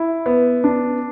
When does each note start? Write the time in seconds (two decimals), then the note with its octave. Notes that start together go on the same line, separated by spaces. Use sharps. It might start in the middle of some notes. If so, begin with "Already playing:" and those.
Already playing: E4
0.26 B3
0.64 D4